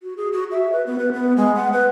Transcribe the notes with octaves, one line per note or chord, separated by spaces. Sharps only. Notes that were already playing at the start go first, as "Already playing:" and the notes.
F#4
G#4
F#4
E5
B4
B3
B4
B3
G#3
F#5
B4